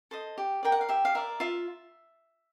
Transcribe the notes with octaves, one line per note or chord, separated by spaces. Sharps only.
A4 C5 D#5
G4
A#4 D5 G5
F#5
F5
G4 E5
F5
A#4 D5 E5
F4 E5